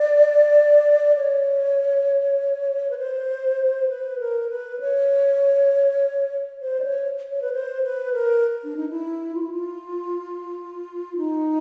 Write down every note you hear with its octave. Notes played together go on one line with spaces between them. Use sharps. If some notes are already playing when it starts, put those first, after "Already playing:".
Already playing: D5
C#5
B4
C5
B4
A#4
B4
C#5
C5
D5
C#5
C#5
B4
C5
B4
A#4
D4
D#4
E4
F4
E4
F4
D#4